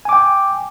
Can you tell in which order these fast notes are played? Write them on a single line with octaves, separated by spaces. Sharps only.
G#5 D6 G5